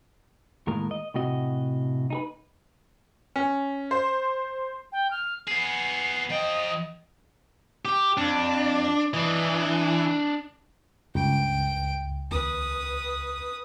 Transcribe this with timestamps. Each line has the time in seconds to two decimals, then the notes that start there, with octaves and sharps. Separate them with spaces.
0.67 D#2 A2 G#3 A#4
0.91 D#5
1.14 A2 C3 F#4 D#5
2.10 D#4 G#4 B4
3.36 C#4
3.91 C5
4.92 G5
5.11 F6
5.48 B3 G#4 C7
6.30 F3 D#5 G5
7.85 G4
8.17 F2 D4
9.14 E3 D4 D#5
11.15 C#2 G2 G5 D7
12.31 D#2 B4 D#6